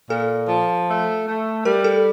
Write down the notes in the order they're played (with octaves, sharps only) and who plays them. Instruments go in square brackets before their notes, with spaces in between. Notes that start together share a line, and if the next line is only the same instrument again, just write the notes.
[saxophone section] A#2 [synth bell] A4
[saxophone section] F3
A3
A3
[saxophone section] G3 [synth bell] A#4
[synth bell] A4